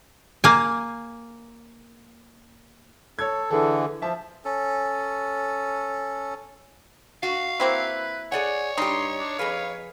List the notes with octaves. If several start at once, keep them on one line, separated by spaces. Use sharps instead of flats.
A#3 G#5
A4 C#5 G#6
D3 E3 G#4 A4
F3 E5 A5
C#4 A4
F#4 F5
A#3 C4 E4 B4
G#4 C#5 D5 F#5 G#5
G2 D#4 G4 C6
D4
F2 G#4 B4 F5